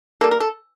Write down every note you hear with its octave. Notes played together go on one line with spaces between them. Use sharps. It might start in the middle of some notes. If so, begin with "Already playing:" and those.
G3 A#3 A4
A#4
A4